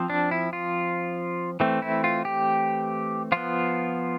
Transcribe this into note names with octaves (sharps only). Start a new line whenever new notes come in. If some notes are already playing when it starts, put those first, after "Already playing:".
Already playing: F3 C4
D4
E4
F4
E3 A3 C4
E4
F4
G4
F3 B3 F4